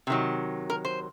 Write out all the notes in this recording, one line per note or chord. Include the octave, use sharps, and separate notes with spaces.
C3 D#3 F#3
A#4
C5